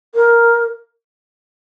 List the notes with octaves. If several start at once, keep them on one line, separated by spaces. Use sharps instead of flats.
A#4